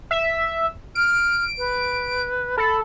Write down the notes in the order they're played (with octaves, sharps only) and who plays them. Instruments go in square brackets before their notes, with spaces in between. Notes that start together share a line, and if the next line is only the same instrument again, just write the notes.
[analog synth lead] E5
[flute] F6 [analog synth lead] D7
[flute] B4
[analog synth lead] A4 [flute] B5